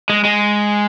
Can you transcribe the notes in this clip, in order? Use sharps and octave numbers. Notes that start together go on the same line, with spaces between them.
G#3
G#3